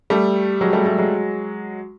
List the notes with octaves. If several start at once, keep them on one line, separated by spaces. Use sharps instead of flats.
G3 A3
F#3 G#3
G3 A3
G3 A3
F#3 G#3